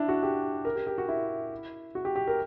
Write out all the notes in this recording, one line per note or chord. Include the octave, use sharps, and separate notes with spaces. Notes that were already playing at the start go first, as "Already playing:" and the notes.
Already playing: D4 E4
F#4
G4
A#4
G4
G4
F#4
E4
F#4
G4
G4
A#4